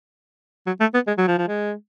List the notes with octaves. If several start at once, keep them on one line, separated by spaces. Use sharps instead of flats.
F#3
A3
B3
G#3
F#3
F3
F3
G#3